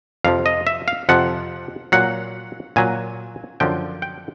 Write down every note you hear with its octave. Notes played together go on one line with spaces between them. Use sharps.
F2 C3 F3 F5
D#5
E5
F5
F2 C3 F3 F#5
A#2 F#3 F#5
A#2 F#3 G#5
F#2 D3 F3 G5
G5